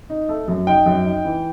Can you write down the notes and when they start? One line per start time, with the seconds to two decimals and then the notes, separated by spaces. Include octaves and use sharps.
0.10 D#4
0.29 A3
0.48 F#2
0.67 D#4 G5
0.86 F#2
1.05 D#4
1.25 E3